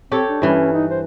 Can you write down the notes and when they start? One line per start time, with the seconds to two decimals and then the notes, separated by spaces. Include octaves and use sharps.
0.11 C4 G4 A4 C#5
0.29 D4
0.42 G2 E3 C#4
0.73 D#4
0.90 C5